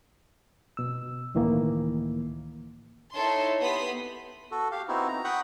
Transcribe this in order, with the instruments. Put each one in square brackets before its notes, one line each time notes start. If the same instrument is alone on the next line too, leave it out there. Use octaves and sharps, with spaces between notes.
[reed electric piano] B2 E6
C#2 A2 D#3 E3 A#3
[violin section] D#4 E4 A4 C#5 C6
B3 G4 B5 C6 D#6 B6
[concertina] F#4 A4
G4 F5
B3 C4 D#4 E4 F#4
A#5
F#5 G5 B5 C#6 D#6